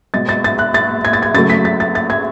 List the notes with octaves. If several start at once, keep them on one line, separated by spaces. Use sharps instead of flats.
B2 G#3 A6
A6
A6
F#6
A6
G#6
A6
G#6
C#3 F#3 A3 A6
B6
A6
A6
A6
G#6